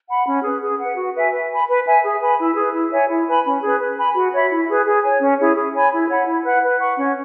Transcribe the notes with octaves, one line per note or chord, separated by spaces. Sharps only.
F#5 B5
C#4
G#4 B4
G#4
B4 F#5
F#4
B4 E5 G#5
B4
G#5 B5
B4
E5 G#5
G#4
B4 G#5 B5
E4
G#4 B4
E4
C#5 E5 G#5
E4
B4 G#5 B5
C#4
G#4 B4
B4
G#5 B5
F#4
C#5 E5 B5
E4
G#4 B4
G#4
C#5 G#5
C#4
E4 G#4 C#5
G#4
C#5 G#5 B5
E4
C#5 F#5 B5
E4
B4 F#5
B4
F#5 C#6
C#4